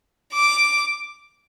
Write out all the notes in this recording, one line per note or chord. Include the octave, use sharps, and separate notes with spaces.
D6